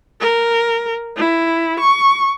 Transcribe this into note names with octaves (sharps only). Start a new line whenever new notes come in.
A#4
E4
C#6